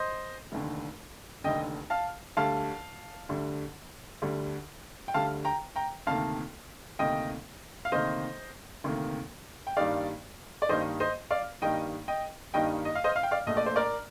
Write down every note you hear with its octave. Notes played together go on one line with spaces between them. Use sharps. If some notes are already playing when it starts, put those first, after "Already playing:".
Already playing: C5 D#5
F1 D#2 D3
F1 D#2 D3 D#5 G5
F5 A5
D2 D3 G3 F5 A5
D2 D3 G3
D2 D3 G3
G5
D2 D3 G3 F5 A5
G5 A#5
G5 A#5
D2 C3 D#3 A#3 F5 A5
D2 C3 D#3 A#3 D#5 G5
F5
D2 C3 D#3 A#3 C5 D#5
D2 C3 D#3 A#3
G5
G2 D#3 G3 A#3 D#4 D5 F5
D5
G2 D#3 G3 A#3 D#4 C5 D#5
C5 D#5
D5 F5
G2 D#3 G3 A#3 D#4 D#5 G5
D#5 G5
G2 D#3 G3 A#3 D#4 D#5 G5
D#5
F5
C5 D#5
F5
G5
D5 F5
A#1 A#2 A3 D#5
D5
C5
A#4 D5